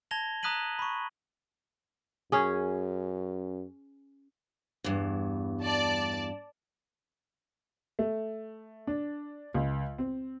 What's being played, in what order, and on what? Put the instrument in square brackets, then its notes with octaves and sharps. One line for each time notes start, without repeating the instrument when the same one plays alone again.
[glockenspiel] A5 G#6 A#6 F7 G7
A#5 D#6 F#6 B6 D#7 F#7
B5 C#6
[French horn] F#2 [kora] C#4 G#4
[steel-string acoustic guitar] E2 G2
[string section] D5 A5
[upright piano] A3
D4
C#2
C4